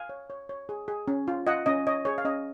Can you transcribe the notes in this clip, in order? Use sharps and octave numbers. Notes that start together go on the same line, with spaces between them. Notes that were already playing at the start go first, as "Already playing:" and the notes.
Already playing: F5 G#5
C#5
C#5
C#5
G#4
G#4
C#4
F4
F4 D#5 F#5
C#4 D#5
C#5 D#5
G#4 C#5
F5
C#4 D#5